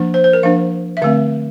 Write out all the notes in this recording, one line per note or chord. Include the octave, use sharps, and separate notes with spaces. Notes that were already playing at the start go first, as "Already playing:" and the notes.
Already playing: F3 A#3 D4
C5
C5
A#4
F3 A#3 D4 F5
E5
D3 A3 C4 F5